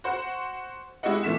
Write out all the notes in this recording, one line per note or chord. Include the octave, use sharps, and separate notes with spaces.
F#4 C5 F#5
G#3 E4 F#4 G4 D#5 F#5
A#2 E3 A3 B6 E7